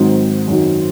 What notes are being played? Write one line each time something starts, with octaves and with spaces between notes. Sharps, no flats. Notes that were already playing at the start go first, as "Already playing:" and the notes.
Already playing: G#2 D#3 F#3 C4
F#2 D#3 F#3